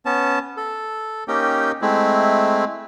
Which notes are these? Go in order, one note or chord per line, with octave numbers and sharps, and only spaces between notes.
B3 C#4 A5
A4
A#3 C#4 D#4 G4 G5
G#3 A3 C4 E4